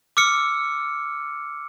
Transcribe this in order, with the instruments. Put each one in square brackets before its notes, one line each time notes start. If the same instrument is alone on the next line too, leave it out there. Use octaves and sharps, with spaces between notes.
[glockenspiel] D6 E6 F6 C#7